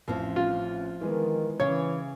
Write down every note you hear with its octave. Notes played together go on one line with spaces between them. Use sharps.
A1 F3 C4 C#4
F4
D#3 E3 G#3 B3
C#3 E3 C#5 G#6